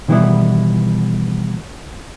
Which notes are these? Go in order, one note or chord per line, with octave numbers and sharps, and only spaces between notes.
B2 D#3 E3 G3 B3 E4